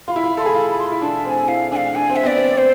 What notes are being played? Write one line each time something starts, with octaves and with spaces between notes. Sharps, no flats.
F4 C6
E4 B5
F4
A4 C6
G#4 B5
F4
B5
C6
E4 B5
D4 A5
C4 G#5 A5
E4 F5
D4 F5 G#5
D4 G#5
C4
E5
B3 D5
C4
C5